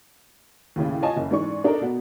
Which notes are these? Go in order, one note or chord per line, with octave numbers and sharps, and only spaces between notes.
D#2 A2 C#3
F4 C#5 D#5 G#5 A5
F#1
G#2 E3 D4 C#6
D4 D#4 A4 A#4
B2 B3